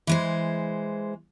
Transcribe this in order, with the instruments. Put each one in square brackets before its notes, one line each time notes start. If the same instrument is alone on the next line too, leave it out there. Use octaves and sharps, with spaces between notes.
[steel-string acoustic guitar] E3 G#3 C5